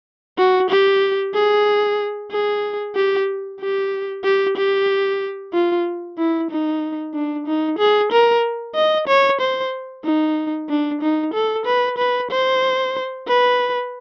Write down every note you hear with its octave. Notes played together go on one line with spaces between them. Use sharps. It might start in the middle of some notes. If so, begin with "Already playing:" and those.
F#4
G4
G#4
G#4
G4
G4
G4
G4
F4
E4
D#4
D4
D#4
G#4
A#4
D#5
C#5
C5
D#4
D4
D#4
A4
B4
B4
C5
B4